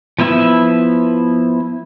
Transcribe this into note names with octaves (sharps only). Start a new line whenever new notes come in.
F3 B3 E4 E5